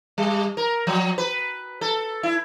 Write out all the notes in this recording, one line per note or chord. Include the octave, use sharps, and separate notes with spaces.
G3
A#4
F3
B4
A4
E4